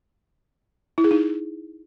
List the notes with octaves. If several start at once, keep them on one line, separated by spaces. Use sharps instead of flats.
E4
G#4
D#4